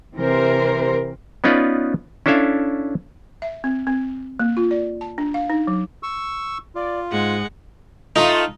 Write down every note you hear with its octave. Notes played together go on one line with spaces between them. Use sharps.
C3 E3 A#4 C5
B3 C#4 D#4 F4 B4 D5
C#4 D4 E4 A4 E5 F5
E5
C4
C4
A#3
F4
D5
A5
D4
F5
D#4
F#3
C#6 E6
F4 D5
G#2 G#3 F#5
A3 D#4 F4